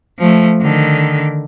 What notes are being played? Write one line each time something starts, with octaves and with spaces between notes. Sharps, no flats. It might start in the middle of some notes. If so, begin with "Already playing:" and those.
F3 A3
D3 D#3